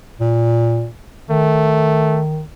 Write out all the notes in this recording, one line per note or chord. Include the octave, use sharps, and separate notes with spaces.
A#2
D#3 A3